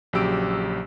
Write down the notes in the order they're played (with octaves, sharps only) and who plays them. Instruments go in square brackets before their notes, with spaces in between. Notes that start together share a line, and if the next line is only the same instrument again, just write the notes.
[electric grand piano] A#1 C#3 F#3 G4 E6 D7